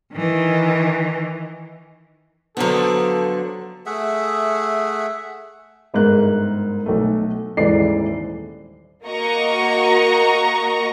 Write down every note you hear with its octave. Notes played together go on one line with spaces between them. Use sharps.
D#3 E3
D3 F3 F#3 B3 A4
A3 G#4 E5 F#5
G1 G#2 A#4 F#6
B1 A3
D#1 G#2 E3 D5 C7
A#3 F#4 D#5 A#5 C#6